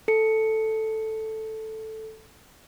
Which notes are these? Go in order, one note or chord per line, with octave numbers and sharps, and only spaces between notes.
A4 C#7